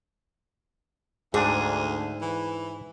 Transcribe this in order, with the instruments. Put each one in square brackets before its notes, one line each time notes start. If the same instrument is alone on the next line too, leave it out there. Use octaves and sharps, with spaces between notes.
[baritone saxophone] D2 [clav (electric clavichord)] G#2 D4 [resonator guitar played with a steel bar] G#4
[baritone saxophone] E3